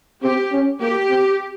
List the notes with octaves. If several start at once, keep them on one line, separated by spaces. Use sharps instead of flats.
C4 G4
C#4
A#3 G4
C4